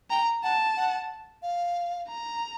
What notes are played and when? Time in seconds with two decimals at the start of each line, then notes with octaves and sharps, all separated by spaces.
0.10 G5 A#5
0.43 F#5 A5
0.77 F#5
1.42 F5
2.09 A#5